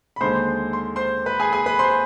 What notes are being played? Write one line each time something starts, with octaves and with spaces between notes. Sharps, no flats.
B5
D#2 D3 G#3 C5 C6
C6
C5 C6
B4 B5
G#4 G#5
G#4 G#5
B4 B5
C5 C6